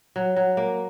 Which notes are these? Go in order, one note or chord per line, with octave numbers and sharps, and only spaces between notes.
F#3
F#3
A#3